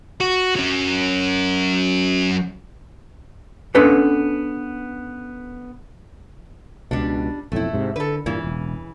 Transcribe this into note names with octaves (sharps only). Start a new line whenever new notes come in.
F#4
F#3 C#4
B3 C#4 D4 A4 B4
C#2 B2 G3 D4
B1 F2 A2 A3 E4
G#2 C3
D3 A4 B4
G2 A#2 C#3 E3
E1